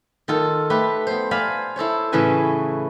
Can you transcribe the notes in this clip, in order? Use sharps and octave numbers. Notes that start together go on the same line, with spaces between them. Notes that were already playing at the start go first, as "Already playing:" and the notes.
D#3 F4 A4
A3 G4 B4
B3 C5
C5 D5 F5 G#5 A5 B5
E4 A4 C5 C#5
A2 C#3 E3 C#4 B4 G#5